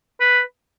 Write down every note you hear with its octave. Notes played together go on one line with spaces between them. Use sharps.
B4